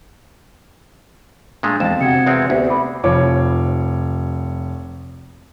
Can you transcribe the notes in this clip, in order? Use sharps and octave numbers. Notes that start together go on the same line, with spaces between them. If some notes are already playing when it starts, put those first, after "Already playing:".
A#2 G#3 A3 D4 A4
E1 F2 A6 E7
C3 F#4 F#5 G#6 C#7
E2 G#3 C4
D2 B3 G4
B5 D6
F1 F3 C#5 D6